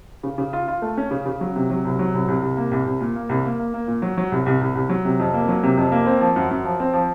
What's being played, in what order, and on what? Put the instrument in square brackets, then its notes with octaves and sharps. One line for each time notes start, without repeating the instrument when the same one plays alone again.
[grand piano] C#3
C#3
F4
F4
A3
C#4
C#3
C#3
F#3
C3
F#3
C2
F#3
C2
C2
C2
A#3
C2
C2
A#2
A#3
C2
A#3
A#3
A#3
A#2
F#3
F#3
C2
C2
C2
C2
F#3
C3
F2
A#3
F#3
C3
F2
A#3
C4
F3
F#2
F#2
F3
C4
F3